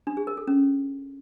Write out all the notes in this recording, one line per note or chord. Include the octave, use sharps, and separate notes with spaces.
D4
G#4
A#4
A4
C#4